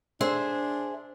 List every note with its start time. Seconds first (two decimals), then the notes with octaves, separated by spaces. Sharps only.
0.21 D4 G#4 C5 E5